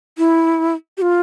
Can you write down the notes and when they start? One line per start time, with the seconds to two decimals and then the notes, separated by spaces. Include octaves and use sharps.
0.18 E4
0.97 G4
1.02 F4